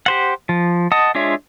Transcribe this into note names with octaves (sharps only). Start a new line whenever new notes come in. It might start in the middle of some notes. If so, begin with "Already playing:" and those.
G4 C5 F#5
F3
D#5 F#5 A5 D#6
G#3 D4 F4 C#5 E5